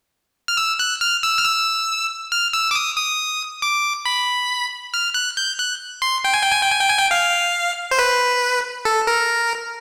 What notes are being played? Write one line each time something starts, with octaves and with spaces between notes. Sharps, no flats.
F6
E6
F#6
F6
E6
F6
E6
F6
E6
D6
D#6
D#6
D6
B5
F6
F#6
G6
F#6
C6
G5
G#5
G5
G#5
G5
G#5
G5
G#5
G5
F5
C5
B4
A4
A#4